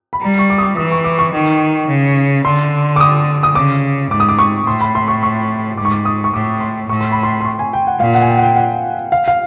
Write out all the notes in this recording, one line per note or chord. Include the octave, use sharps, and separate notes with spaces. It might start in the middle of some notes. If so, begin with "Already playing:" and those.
B5
G3 A#5
C#6
D6
D#6
D6
E3 D#6
C#6
D6
C#6
D#3
C#3
D3 C6
D6
D#6
D#6
C#3 D6
G#2 D6
D#6
D6
C#6
A2 C6
B5
C6
C#6
C#6
G#2 D6
C#6
D6
D#6
C#6
A2 D6
C6
A2 C#6
C6
B5
C6
C6
C#6
G#5
G5
F#5
A#2 F5
F#5
G#5
G5
F#5
G5
F#5
F5
F5